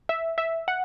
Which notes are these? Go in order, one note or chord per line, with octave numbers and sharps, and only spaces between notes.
E5
E5
F#5